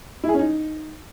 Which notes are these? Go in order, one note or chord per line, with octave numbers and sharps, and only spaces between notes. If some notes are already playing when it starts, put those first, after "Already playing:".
E4
G#4
C#4
D#4